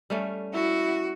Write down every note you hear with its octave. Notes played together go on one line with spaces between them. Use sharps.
G3 A3 C#4
E4 F#4